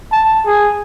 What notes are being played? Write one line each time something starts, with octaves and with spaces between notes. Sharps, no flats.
A5
G#4